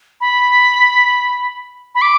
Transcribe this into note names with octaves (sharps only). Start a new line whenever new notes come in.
B5
B5
D6